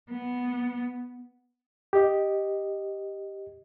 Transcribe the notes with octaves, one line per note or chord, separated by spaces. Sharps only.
B3
G4 D#5